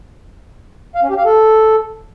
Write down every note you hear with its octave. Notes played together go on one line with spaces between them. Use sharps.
F5
C#4
G4
F5
A4